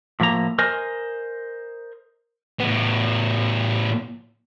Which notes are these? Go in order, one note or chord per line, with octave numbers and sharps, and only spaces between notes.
A2 F3 A#3 A#5
A#4 C5 D#5 G#5
A2 B3